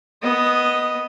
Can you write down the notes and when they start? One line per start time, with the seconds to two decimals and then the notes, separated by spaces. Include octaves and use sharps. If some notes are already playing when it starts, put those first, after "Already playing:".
0.22 B3 D#5